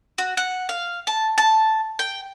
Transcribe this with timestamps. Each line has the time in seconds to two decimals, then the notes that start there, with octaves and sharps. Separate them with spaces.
0.18 F#4
0.37 F#5
0.69 F5
1.07 A5
1.38 A5
1.99 G5